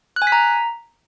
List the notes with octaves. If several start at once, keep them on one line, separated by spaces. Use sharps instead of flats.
F#6
G#5
B6
A#5